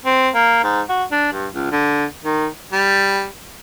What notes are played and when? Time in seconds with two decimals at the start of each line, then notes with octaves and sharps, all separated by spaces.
0.05 C4
0.34 A#3
0.64 G#2
0.89 F#4
1.11 D4
1.32 G2
1.53 C#2
1.71 D3
2.24 D#3
2.73 G3